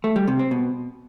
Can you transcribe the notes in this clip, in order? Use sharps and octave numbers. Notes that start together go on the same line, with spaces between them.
A3
G3
C3
C4
B2